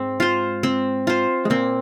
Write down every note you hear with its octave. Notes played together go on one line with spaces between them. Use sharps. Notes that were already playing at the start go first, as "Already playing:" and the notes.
Already playing: G#2 G#3 C4
F4 C5
C4
F4 C5
G#3
A#2 A#3 C4